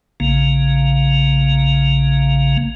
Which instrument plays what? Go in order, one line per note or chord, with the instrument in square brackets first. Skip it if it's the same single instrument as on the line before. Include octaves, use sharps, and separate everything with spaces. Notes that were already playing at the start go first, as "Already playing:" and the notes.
[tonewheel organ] A#1 C#3 A#3